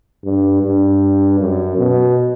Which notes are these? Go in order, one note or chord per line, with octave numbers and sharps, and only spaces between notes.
G2
G2
F#2
B2